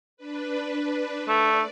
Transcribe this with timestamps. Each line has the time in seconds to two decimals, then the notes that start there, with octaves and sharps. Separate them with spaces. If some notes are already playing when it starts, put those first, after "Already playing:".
0.17 D4 B4
1.28 A3 D5